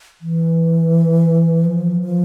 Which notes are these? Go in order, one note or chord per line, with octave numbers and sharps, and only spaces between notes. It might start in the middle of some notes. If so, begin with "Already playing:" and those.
E3
F3
F3